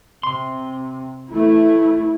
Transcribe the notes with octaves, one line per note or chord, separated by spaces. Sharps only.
C3 C6
E3 A3 E4